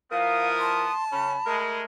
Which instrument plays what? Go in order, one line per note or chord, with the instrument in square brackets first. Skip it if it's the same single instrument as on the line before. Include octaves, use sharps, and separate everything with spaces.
[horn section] F3 E4 A#4 [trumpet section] B3 D#6 [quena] F5
[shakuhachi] A5 [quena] C6
[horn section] C#3 C#4 [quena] B5
[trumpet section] G#3 [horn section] A3 A#4